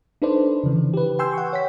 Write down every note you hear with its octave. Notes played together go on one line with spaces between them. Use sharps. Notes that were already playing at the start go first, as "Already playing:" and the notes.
D4 D#4 A4 B4 C5 D5
C#3 E3
G4 B4
G5 G#5 C6 E6 G6
F#5 C#6
C#5 F#5 G5 B6